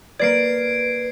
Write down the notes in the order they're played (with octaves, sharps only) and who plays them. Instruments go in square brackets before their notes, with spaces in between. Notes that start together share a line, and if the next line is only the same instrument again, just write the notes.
[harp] A#3 D5 [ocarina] B4 [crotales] G#6 C7 D7